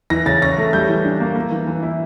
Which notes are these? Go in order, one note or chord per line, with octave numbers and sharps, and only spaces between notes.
E3 A#6
C#3 A6
C#4 A#6
A3
G3 G6
E3
D4
A#3
A#3
E3
E3
E4